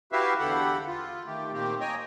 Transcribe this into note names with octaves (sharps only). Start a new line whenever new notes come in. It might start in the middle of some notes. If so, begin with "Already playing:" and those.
E4 F#4 G4 B4 E5 F5
E2 D3 G4 A4 F#5 B5
F4
D#3 A3 G4
A#2 D#3 A#3 C4 G4
C#5 D#5 G5 G#5 A#5